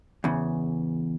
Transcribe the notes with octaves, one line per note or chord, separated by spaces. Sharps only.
E2 C#3